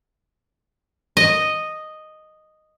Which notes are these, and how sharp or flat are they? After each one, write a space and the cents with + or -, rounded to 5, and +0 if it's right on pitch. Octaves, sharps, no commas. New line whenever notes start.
D#5 -5